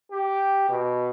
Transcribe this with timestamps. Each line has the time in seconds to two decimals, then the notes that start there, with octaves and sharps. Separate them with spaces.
0.11 G4
0.69 B2